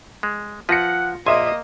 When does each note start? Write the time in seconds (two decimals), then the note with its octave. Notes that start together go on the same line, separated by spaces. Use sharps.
0.23 G#3
0.69 F3 F4 B4 F#5 A#6 C#7
1.26 A#1 A#3 D#5 E5 G#5 C6